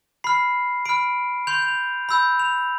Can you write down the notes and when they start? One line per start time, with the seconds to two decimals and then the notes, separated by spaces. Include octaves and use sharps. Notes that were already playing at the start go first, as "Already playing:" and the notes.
0.24 B5 F6 C7
0.85 B5 F6 D7
1.47 C6 G6 F7
1.62 F7
2.09 B5 E6 G6
2.39 F7